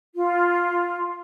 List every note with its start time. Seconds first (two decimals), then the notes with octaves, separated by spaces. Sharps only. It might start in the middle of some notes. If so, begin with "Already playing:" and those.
0.15 F4